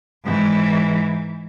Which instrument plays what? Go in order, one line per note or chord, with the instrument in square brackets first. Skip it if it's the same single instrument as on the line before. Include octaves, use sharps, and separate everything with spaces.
[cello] G#2 E3